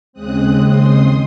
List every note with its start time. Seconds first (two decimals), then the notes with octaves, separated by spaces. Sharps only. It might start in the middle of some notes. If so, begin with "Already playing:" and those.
0.13 D#2 C#3 G#3 C4 D#6 F#6
0.66 C6 D#6